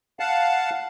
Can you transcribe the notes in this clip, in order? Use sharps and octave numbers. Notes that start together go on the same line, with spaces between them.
F5 F#5 A5